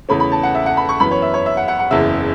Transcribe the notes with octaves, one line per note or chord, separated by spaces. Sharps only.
E2 C#3 A3 C#4 B5
B5
A5
F#5
E5
F#5
B5
C#6
F#2 E3 B3 B5
C#5
E5
C#5
E5
F#5
F#5
F#5
F#1 E2 C#3 E5